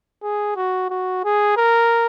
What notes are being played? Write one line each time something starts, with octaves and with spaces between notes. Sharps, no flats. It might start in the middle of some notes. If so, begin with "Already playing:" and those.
G#4
F#4
F#4
G#4
A#4